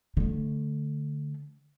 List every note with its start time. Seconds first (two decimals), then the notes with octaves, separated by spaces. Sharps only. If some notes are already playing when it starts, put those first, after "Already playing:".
0.17 D3 A3